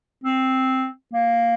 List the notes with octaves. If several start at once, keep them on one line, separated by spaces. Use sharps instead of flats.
C4
A#3